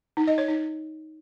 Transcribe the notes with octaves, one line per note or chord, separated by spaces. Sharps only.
D#4
D#5
C#5
D#4